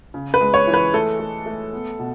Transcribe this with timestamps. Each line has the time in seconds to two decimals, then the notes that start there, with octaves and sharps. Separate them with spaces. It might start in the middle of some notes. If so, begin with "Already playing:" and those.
0.14 C#3
0.34 B4
0.41 G#3
0.54 C#5
0.67 E3
0.74 B4
0.94 A3 A4
1.20 A3
1.46 A3
1.73 B3
1.99 B2